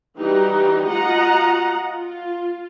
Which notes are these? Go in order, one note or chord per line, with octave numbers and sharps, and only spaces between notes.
E3 G3 D#4 F#4 G4
F4 F#4 D#5 F#5 A#5
F4